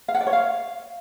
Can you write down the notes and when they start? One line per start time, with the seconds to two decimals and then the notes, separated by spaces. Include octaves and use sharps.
0.08 F5
0.14 F#5
0.21 D5
0.27 C#5
0.33 F5